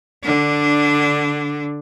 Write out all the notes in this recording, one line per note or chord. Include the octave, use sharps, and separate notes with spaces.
D3 D4